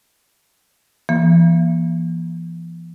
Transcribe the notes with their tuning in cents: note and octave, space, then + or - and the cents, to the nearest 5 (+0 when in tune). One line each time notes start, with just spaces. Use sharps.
E3 +40 A#3 +40